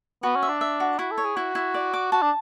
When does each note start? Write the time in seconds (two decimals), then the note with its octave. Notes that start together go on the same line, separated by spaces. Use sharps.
0.23 B3 F#4
0.36 C#4
0.43 E5
0.49 D4
0.61 E5
0.80 F#4
0.99 E4 F#4
1.12 A4
1.18 C#5
1.25 G#4
1.36 E4 F#4
1.55 E4
1.74 D5
1.94 D6
2.12 F#4 A5
2.22 D4